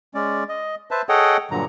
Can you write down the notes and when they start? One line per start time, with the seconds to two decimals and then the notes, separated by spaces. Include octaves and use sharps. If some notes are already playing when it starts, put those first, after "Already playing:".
0.14 G#3 C#4 D5
0.49 D#5
0.91 B4 C5 E5 A5
1.09 G#4 A4 C#5 D#5 F#5 G5
1.51 G2 A#2 D3 F#3 A#5